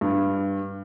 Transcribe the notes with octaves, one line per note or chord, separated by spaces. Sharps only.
G2